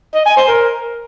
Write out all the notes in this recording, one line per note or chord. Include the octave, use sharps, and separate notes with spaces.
D#5
G#5
C5
A#4